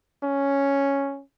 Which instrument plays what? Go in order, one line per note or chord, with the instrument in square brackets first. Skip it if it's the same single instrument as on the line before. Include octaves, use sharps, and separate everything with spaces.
[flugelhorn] C#4